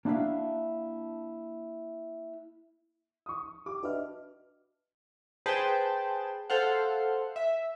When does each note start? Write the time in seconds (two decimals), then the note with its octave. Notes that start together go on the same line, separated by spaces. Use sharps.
0.05 A#3 D4 E4 F#4 E5 F5
3.26 C#6 D#6
3.66 G4 D6
3.83 D4 F#4 B4 D#5 E5 F6
5.46 G#4 B4 C5 G5 A5
6.50 A4 C5 F5 F#5
7.36 E5